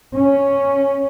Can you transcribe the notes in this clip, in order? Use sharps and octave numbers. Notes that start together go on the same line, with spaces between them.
C#4